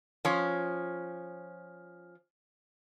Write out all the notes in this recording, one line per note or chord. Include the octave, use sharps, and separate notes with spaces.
F3 C#4